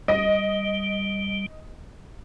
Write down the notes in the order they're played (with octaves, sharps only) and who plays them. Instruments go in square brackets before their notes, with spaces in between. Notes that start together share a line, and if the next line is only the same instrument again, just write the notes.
[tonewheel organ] G3 [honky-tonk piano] D#5